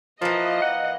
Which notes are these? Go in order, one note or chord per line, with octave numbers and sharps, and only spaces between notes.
E3 F3 A#3 D#5
F#5